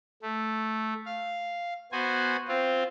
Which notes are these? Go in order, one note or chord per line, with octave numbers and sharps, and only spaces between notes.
A3
F5
B3 F#4 C5 G#5
C4 F4